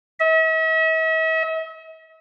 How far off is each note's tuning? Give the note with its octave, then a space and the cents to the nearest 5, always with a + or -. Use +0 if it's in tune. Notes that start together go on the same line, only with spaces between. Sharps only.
E5 -45